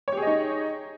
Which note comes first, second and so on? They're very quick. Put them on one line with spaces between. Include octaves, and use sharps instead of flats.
C#5 G4 G#4 D#5 D#4